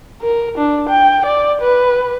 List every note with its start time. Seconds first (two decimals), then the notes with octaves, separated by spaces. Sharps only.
0.22 A#4
0.58 D4
0.89 G5
1.26 D5
1.62 B4